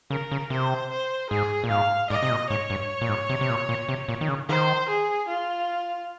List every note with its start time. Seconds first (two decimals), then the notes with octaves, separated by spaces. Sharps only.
0.10 C#3 A#4
0.31 C#3
0.50 C3 C5
0.90 C5
1.30 G#2 G#4
1.64 A#2
1.70 G#2 F5
2.10 G#2 D#5
2.23 C3
2.30 A#2
2.50 G#2 C#5
2.70 G2
3.01 A#2
3.09 G#2
3.29 C3
3.41 C3
3.50 A#2
3.69 A#2
3.88 C3
4.09 A#2
4.21 D#3
4.28 C#3
4.49 D#3 C5
4.88 G#4
5.28 F4